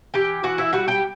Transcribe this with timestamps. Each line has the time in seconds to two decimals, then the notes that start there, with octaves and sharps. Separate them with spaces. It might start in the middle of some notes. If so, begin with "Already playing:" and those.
0.14 E3 G4 G5
0.43 E3 F#4 F#5
0.58 E4 E5
0.73 G3 F#4 F#5
0.88 G4 G5